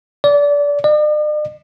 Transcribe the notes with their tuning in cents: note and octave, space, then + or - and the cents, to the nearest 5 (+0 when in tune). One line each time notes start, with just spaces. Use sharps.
D5 -25
D5 +45